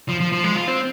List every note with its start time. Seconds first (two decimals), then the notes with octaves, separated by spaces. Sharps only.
0.09 F3
0.20 F3
0.32 F3
0.44 G#3
0.55 F4
0.68 C4